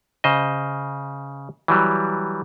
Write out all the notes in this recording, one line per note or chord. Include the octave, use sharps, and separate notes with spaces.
C#3 C5 D#5
E3 F#3 G3